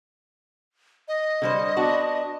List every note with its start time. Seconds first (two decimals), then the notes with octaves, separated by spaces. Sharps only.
1.08 D#5
1.42 D3 G3 C5
1.76 B3 D4 F#4